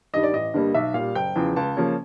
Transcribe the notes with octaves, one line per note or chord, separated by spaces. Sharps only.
G2 D#3 G3 D#5
D5
A1 D#5
G2 D3 G3 A#3
B1 E5
A#2 G3 F5
F#1 G5
E2 C#3 F3
C#2 A5
C#3 F3 A#3 C#4